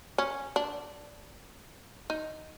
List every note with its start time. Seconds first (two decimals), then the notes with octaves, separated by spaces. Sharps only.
0.18 C#4
0.56 D4
2.10 D#4